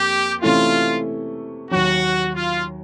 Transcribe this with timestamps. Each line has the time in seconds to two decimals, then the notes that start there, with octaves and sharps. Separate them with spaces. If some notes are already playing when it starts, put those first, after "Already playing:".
Already playing: F2 A#3 G4
0.41 C3 E3 A3 C#4 E4 F4
1.71 D#2 D#3 F#3 F#4
2.35 F4